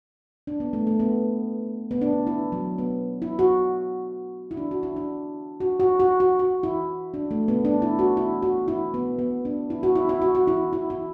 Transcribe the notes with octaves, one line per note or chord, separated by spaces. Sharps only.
D4
B3
A3
A3
B3
B3
D4
E4
F#3
B3
E4
F#4
E4
D4
F#4
E4
D4
F#4
F#4
F#4
F#4
F#4
E4
D4
A3
B3
D4
E4
F#4
E4
F#4
E4
B3
B3
D4
E4
F#4
E4
E4
F#4
F#4
E4
E4
E4